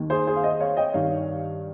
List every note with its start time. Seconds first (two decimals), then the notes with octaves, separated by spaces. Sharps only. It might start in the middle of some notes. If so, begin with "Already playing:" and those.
Already playing: D#2 D#3
0.10 G#4 C5
0.27 G#4 C5
0.36 F5
0.44 C5 D#5
0.60 C#5 F5
0.77 D#5 G5
0.93 G2 D#3 C#5 F5